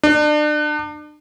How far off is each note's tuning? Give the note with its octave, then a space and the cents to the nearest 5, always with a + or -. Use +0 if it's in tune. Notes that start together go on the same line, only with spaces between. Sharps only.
D4 +35